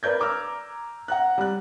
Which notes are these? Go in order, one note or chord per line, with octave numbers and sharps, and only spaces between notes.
A#4 B4 D5 G6 G#6
A#5 D6 E6 F6
F#5 A#5 F#6
G3 F#6